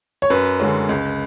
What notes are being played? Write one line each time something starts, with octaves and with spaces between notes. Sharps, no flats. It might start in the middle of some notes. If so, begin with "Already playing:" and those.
C#5
F#2 B4
D3 G#3 C#4
C#2